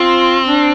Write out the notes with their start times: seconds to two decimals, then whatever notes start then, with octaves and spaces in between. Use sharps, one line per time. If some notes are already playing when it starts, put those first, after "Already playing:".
Already playing: C4 F4
0.46 D4